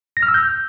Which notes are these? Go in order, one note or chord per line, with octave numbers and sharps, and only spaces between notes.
A#6
F6
E6
G6